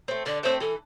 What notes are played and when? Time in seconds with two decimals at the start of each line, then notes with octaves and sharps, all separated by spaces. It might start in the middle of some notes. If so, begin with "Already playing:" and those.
0.08 A3 C4
0.26 D3 D5
0.43 A3 C4 C5
0.60 E3 A4